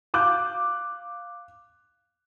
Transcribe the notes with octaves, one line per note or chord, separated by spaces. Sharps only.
F5 D6 F#6 G6